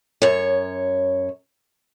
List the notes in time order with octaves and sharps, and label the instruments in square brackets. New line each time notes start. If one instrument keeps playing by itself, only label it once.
[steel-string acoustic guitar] F#2 C#5